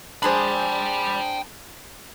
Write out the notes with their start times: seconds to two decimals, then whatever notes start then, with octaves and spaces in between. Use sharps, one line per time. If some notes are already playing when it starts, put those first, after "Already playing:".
0.23 D4 G#4 C5 G5 B5